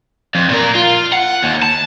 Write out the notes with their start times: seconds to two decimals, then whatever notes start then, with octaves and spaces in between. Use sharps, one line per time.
0.35 F2
0.49 A#2 A#4
0.75 F4
1.13 F#5
1.43 D#2
1.63 A5